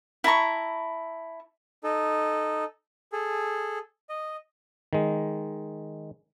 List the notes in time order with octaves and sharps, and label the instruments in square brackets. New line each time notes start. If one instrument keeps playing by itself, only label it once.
[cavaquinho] E4 A5 A#5 C#6
[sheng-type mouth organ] D#4 A4
G#4 A4
D#5
[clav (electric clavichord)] D#3 G#3